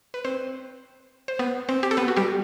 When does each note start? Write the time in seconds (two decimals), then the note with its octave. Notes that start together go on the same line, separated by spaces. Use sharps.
0.14 B4
0.25 C4 C5
1.28 C5
1.39 B3 B4
1.69 C4 C5
1.83 G4
1.91 A4
1.97 B3 B4
2.08 F#4
2.16 G3 G4